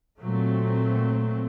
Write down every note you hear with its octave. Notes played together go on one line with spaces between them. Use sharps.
A#2 F#3 A3 C4